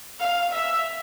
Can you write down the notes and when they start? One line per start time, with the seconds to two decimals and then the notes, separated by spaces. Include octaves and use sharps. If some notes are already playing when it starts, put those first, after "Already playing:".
0.20 F5
0.53 E5